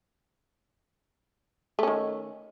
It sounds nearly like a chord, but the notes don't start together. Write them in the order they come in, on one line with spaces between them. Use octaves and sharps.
A3 C#4 D#3